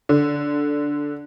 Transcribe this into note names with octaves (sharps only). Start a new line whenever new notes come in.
D3